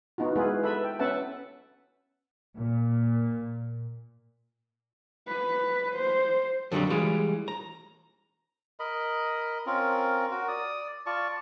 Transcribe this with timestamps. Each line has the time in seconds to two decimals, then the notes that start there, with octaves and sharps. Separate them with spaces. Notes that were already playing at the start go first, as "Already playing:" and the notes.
0.18 B3 D#4 F4 F#4
0.36 G#3 B3 E4 F4 G#4 B4
0.63 A4 B4 E5 B5
0.84 G5
0.99 B3 C#4 B4 E5 F#5 A5
2.57 A#2
5.28 B4
5.95 C5
6.72 F2 D3 D#3 F#3 G3
6.90 E3 G3 G#3 F4
7.48 A#5
8.80 A#4 D#5 B5
9.66 C4 C#4 F4 A#4
10.31 F#4 A#4
10.48 D5 D#6
11.06 F4 D5 A5 C#6